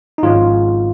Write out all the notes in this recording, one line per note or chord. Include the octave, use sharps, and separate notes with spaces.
D#4
G#1 G#2 F3 G#3 C#4 F4